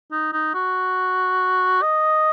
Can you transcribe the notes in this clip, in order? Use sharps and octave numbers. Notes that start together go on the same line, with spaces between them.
D#4
D#4
F#4
D#5